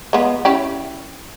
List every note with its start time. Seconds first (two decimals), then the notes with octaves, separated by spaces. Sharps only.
0.13 G#3 B3 F4
0.45 C#4 E4 G4